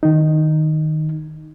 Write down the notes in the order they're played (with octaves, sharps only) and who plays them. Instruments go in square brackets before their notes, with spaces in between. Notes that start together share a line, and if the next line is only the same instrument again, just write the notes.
[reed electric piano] D#3 D#4